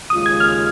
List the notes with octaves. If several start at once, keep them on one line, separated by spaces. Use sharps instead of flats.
D#2 C#3 G#3 F4 D#6
G#6
F6